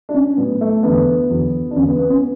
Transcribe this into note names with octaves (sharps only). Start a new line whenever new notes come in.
D4
C#4
A2 F#3 B3
A3
E2 D3 F#3 B3
E2 D3 F#3
D4
E2 D3 F#3 C#4
B3
B3
C#4
B3